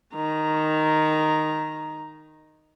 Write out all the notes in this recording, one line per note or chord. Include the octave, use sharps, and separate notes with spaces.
D#3 A#5